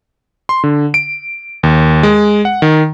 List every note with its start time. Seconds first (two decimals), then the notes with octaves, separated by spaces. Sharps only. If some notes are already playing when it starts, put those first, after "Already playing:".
0.49 C6
0.64 D3
0.94 D7
1.63 D#2
2.03 G#3
2.45 F#5
2.62 D#3